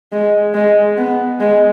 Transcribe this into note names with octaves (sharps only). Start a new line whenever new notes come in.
G#3
G#3
B3
G#3